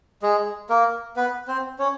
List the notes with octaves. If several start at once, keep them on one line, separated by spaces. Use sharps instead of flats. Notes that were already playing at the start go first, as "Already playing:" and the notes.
G#3 G#4
A#3 A#4
B3 B4
C4 C5
C#4 C#5